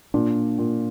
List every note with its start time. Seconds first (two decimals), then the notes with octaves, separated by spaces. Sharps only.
0.14 A#2 D4
0.58 A#2